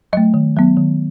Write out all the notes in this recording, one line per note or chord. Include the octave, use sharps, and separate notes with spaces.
F#3 A3 D#5
D#3
F#3 B3
D#3